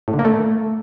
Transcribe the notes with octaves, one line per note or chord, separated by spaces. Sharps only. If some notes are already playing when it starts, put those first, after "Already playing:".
A2
D3
A#3
A3